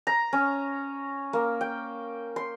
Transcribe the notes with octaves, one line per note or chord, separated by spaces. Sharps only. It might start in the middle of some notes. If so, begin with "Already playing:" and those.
A#5
C#4
A#3
G5
C6